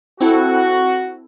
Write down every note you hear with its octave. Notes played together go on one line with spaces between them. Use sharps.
C4 E4 F#4 A4